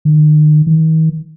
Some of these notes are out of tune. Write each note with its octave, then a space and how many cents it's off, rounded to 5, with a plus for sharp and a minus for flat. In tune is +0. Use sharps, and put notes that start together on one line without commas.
D#3 -40
D#3 +40